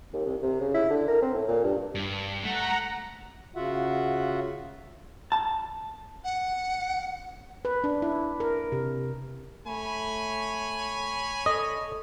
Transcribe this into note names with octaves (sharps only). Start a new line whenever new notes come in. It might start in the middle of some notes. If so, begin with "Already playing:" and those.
D#2
C2
C3
C#3
E4
D3
A#4
C4
A2
A#2
G2
G2
A3 F#5 A#5
C#3 F4 F#4 E5 F#5
A5
F#5
B4
D4
E4
A#4
C3
A3 C#5 G#5 B5
A4 D#5